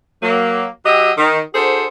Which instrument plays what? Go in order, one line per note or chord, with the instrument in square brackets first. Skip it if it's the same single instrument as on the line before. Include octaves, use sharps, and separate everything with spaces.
[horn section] F#3 A#3
F#3 F#4 G4 D#5 E5 G5
D#3
D4 F#4 G#4 A4 C5